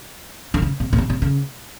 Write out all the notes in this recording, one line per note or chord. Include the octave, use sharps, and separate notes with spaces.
D3
C#3
C3
B2
C3
C3
C#3